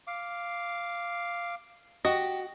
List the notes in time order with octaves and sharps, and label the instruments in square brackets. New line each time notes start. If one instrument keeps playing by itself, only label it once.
[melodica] F5 D6
[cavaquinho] F#4 [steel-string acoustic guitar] G4 [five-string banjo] D#5